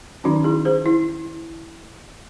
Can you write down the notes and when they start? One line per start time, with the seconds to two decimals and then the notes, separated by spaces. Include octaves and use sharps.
0.24 D#3 F#3 C#4 D#4 F#4
0.44 E4 G#4
0.65 G#4 C5
0.86 E4